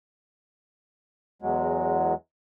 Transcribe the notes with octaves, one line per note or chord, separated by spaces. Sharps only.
E2 F#3 G#3